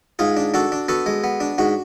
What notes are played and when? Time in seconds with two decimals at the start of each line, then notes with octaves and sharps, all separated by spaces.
0.19 G#2 F4 G#4
0.37 D4
0.54 D4 F#4 A4
0.72 D4
0.88 B3 F#4 A4
1.06 G#3
1.24 B3
1.40 D4
1.58 G#2 F#4